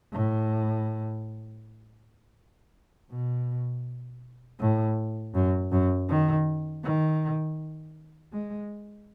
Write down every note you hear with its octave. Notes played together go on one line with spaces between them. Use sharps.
A2
B2
A2
F#2
F#2
D#3
D#3
G#3